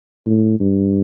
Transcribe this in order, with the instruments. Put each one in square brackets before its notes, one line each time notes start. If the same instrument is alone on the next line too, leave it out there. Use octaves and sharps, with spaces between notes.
[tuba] A2
G2